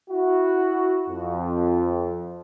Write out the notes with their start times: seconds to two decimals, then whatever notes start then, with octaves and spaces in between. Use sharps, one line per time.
0.10 E4 F#4
1.08 F2